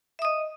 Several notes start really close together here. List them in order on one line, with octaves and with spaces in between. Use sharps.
E5 D#6 D#5